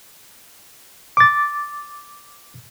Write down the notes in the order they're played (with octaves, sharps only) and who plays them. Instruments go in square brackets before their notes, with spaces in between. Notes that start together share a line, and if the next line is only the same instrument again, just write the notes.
[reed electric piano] D6 A6